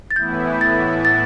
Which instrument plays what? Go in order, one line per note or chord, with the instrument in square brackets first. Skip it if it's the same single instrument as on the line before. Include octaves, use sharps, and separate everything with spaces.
[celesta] A6
[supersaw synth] A2 E3 B3 E4 [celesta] G6
[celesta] G6
A6
A6